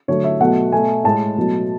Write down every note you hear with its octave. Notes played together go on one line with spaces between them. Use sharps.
D3 F#3 A3 C#5
E5
B2 F#3 A3 F#5
B2 A3 G#5
A2 G#3 A5
B2 F#3 A3